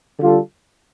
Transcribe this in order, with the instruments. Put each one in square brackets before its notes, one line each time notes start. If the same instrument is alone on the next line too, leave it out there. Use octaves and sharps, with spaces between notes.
[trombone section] D3 G3 F4 A4